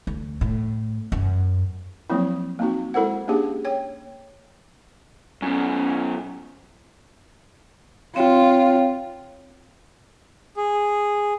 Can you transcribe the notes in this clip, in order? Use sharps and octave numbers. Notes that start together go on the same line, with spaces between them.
D2
A2
F#2
F3 F#3 A#3 C4 E4
A#3 C4 D#4 F#4
G#3 E4 A4 A#4 C5 F#5
A#3 C#4 D4 G4 G#4
C#5 G5
F#2 B2 C#4
C4 F4 C#5 G5
G#4